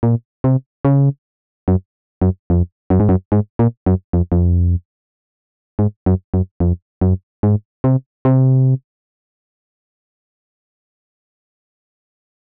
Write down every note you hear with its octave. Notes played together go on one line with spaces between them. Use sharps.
A#2
C3
C#3
F#2
F#2
F2
F#2
G#2
F#2
G#2
A#2
F#2
F2
F2
G#2
F#2
F#2
F2
F#2
G#2
C3
C3